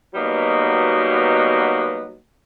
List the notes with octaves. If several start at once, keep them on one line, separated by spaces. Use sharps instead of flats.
B2 F#3 G3 A#3 B3 D#4